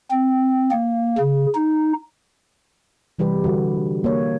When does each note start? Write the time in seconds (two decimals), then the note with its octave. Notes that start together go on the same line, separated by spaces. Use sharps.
0.11 C4
0.71 A#3
1.18 C#3
1.55 D#4
3.19 C3 E3 G3 G4 B4
3.44 D3 G3 F#4
4.04 A#3 C#5